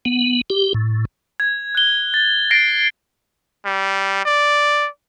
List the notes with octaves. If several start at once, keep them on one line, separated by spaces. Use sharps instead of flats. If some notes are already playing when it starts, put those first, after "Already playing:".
B3
G4
A2
G#6
F#6 G7
A6
A6 A#6 C7 D7
G3
D5